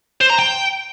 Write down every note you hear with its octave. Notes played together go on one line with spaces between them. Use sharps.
C5
A#5
G5